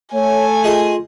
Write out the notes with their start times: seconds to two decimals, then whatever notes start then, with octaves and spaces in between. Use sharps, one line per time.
0.13 A3 C#5 G#5
0.64 F4 G#4 D#5 D#6